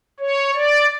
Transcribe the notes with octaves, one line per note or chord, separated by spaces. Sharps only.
C#5
D5